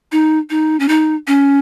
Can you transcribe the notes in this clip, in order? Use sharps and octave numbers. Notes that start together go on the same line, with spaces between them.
D#4
D#4
C#4
D#4
C#4